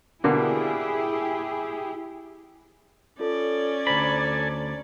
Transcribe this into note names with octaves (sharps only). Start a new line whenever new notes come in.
B2 D3 A#3 E4 G4 G#4
C#4 F4 A4 C#5 D5
D2 A4 C5 G#5 A#5 B5 D6